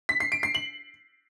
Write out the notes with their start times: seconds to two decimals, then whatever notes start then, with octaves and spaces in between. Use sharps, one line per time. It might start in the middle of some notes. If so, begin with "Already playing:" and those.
0.09 B6
0.20 C7
0.32 D7
0.43 C7
0.55 F#7